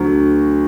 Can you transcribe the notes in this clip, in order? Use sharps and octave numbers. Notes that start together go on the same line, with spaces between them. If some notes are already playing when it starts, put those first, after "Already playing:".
Already playing: D2 D3 F#3